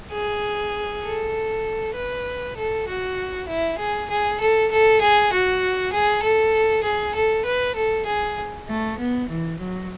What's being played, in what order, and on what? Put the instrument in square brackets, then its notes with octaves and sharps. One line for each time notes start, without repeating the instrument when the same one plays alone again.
[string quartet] G#4
A4
B4
A4
F#4
E4
G#4
G#4
A4
A4
G#4
F#4
G#4
A4
G#4
A4
B4
A4
G#4
A3
B3
E3
F#3